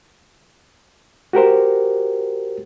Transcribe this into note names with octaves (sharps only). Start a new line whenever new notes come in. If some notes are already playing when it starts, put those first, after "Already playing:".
F#4 G4 A#4 C5